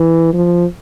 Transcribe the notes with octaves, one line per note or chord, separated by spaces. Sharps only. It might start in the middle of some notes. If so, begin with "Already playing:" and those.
Already playing: E3
F3